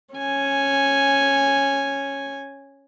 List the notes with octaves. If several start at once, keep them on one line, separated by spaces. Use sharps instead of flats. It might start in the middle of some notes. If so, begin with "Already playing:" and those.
C#4 G#5